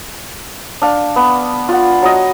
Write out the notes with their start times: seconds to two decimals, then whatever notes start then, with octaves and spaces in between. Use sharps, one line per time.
0.82 D4 F5
1.16 B3
1.69 F4 F#5
2.03 F#3 D#5